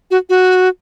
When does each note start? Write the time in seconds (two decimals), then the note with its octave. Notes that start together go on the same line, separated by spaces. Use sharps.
0.11 F#4
0.29 F#4